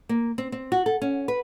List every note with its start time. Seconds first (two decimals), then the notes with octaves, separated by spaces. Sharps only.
0.09 A#3
0.38 C4
0.52 C4
0.72 F#4
0.86 A4
1.02 C#4
1.28 B4